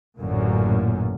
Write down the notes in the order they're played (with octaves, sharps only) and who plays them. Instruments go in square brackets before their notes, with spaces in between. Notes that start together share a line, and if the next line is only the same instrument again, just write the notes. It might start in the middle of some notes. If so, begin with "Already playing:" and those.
[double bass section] A1 F#2 A#2 D3